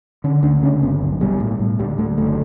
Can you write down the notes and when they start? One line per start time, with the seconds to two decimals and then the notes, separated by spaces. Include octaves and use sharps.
0.24 D3 C#4
0.43 D2 D4
0.62 C#3 C#4
0.82 G1 B3
1.01 B1
1.21 B2 G3
1.40 A2
1.60 A2
1.79 D2 G3
1.98 D2 A3
2.18 F#1 A3